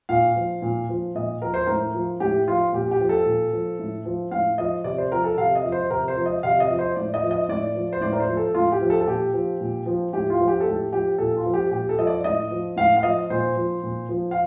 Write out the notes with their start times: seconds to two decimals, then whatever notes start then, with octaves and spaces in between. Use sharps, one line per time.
0.09 A#2 F5
0.36 F3
0.62 A#2
0.89 F3
1.15 A#2 D#5
1.42 F3 A#4
1.54 C5
1.66 A2 A#4
1.94 F3
2.20 A2 G4
2.47 F3 F4
2.73 A#2 G4
2.91 G4
3.00 F3
3.09 A4
3.26 A#2
3.53 F3
3.79 A2
4.05 F3
4.31 A2 F5
4.58 F3 D#5
4.84 C3 D5
4.98 C5
5.12 F3 A#4
5.24 A4
5.37 C3 F5
5.55 D#5
5.64 F3
5.72 C5
5.90 C3 A#4
6.08 C5
6.17 F3
6.26 D#5
6.43 C3 F5
6.60 D#5
6.70 F3
6.79 C5
6.96 A2 D5
7.14 D#5
7.23 F3
7.31 D#5
7.49 A2 D5
7.75 F3
7.93 C5
8.01 A2 D5
8.13 A#4
8.20 C5
8.28 F3
8.37 A4
8.55 A2 F4
8.72 G4
8.81 F3
8.90 A4
9.01 A4
9.07 A#2 G4
9.33 F3
9.61 A#2
9.86 F3
10.13 A2 G4
10.30 F4
10.40 F3
10.48 G4
10.61 A4
10.66 A2 G4
10.92 F3 G4
11.18 A#2 A4
11.37 F4
11.45 F3
11.53 G4
11.71 A#2 G4
11.89 A4
11.98 F3 D#5
12.07 D5
12.24 A2 D#5
12.51 F3
12.76 A2 F5
12.96 F5
13.03 F3 D#5
13.30 A#2 C5
13.56 F3
13.83 A#2
14.09 F3
14.31 F5